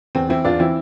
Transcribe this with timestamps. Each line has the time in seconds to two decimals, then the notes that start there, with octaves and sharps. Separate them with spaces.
0.15 E2 C4
0.29 E3 C4 E4
0.45 E2 D4 F4
0.59 E3 C4 E4